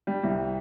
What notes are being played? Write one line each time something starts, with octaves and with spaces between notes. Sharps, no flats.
G3
C2